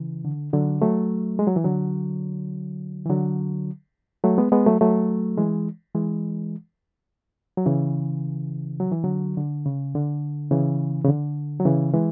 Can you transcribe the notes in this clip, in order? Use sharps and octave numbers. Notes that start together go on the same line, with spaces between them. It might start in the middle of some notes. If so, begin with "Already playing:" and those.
Already playing: C#3 E3
D3
D3 F#3
F#3 A3
G#3
F#3
E3
D3 F#3
E3
D3 F#3
F#3 A3
G#3 B3
G#3 B3
F#3 A3
F#3 A3
E3 G#3
E3 G#3
F#3
C#3 E3
F#3
E3
D3 F#3
D3
C#3
D3
C#3 E3
C#3
D3
F#3
C#3 E3
E3 G#3